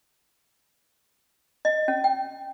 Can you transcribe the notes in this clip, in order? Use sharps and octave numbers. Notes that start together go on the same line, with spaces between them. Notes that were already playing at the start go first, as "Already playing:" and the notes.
D#5
C#4
G5